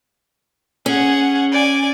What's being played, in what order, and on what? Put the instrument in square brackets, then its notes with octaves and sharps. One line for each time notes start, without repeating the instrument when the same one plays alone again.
[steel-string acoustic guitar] C#4 [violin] G#4 F#5
[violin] D5 G#5